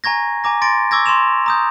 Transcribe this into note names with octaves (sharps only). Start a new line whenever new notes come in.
G#5 A#5 C#6 G#6 A#6
G#5 A#5 D6 A#6
C6 A6 A#6 D7
C#6 D6 E6 G#6 A#6
C6 C#6 E7 F7
A#5 D#6 G6